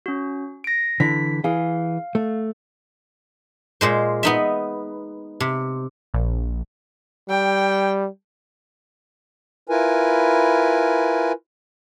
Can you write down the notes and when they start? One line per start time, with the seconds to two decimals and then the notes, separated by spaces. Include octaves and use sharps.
0.06 C#4 F#4
0.64 A#6 D7
1.00 D3 E3 B6
1.44 E3 G#4 F5
2.15 A3
3.81 A#2 G#3 C5
4.23 B3 D#4 E5
5.40 C3
6.14 A#1
7.29 G3 G5
9.69 E4 F4 A#4 B4 G#5